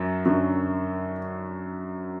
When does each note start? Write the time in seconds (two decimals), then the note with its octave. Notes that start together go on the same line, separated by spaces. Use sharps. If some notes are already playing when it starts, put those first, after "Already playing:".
Already playing: F#2 F#3
0.25 F#2 D3 F#3